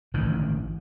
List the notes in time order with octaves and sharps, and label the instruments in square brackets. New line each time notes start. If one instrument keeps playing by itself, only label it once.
[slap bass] A1 G#2 D3 D#3